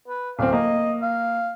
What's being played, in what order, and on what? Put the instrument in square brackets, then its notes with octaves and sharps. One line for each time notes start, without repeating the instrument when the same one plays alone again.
[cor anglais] B4
[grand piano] D1 C4 [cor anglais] F5
[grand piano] A#3 [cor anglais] D#5
[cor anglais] F5